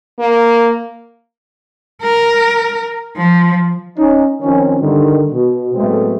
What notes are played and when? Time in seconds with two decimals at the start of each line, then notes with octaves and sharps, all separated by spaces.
0.19 A#3
2.02 A#4
3.16 F3
3.97 C#4 D#4
4.42 D#3 F3 C4 C#4
4.81 G2 D3 D#3
5.32 B2
5.74 A2 F#3 G#3 A3 B3 C4